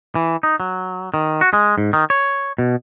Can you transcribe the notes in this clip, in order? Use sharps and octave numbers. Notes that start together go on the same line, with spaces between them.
E3
D#4
F#3
D#3
F#4
G#3
G#2
D#3
C#5
B2